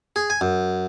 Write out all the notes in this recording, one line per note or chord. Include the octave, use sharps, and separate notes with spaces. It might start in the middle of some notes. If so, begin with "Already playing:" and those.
G#4
G#5
F#2